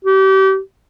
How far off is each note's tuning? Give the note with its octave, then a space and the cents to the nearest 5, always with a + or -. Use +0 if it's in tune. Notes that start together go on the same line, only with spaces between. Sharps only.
G4 -35